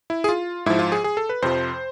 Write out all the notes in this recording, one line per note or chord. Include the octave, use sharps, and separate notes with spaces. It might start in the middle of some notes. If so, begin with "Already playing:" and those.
E4
G#4
F4
G#2 F3 E4
F4
G#4
G#4
A4
B4
F2 C3 F3 C5